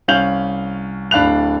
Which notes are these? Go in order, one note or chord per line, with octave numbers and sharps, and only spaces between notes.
C2 C#4 F5 G6 F7 F#7
D1 D4 F5 B5 F#6 F7